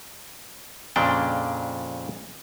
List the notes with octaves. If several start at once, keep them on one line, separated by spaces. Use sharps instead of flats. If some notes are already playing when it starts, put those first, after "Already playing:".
F2 A#2 C#3 D4 G5